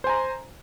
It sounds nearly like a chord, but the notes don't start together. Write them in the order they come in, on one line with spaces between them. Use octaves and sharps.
C5 G#5 A#5